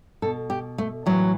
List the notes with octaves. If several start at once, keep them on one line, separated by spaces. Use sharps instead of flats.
B2 A4
G4
A3
A2 E3 F#3